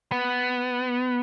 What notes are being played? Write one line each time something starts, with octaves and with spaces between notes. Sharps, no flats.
B3